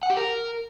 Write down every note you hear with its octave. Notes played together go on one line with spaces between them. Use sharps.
F#5
G4
A#4